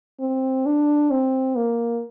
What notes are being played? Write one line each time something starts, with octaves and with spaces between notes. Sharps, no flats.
C4
D4
C4
A#3